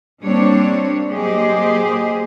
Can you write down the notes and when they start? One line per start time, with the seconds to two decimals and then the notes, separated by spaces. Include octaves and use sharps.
0.23 G3 A#3 C4 D4 C#5
1.11 F#3 A#3 G4 G#4 C5 D#5